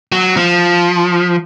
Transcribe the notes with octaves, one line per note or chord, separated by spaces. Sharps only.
F#3
F3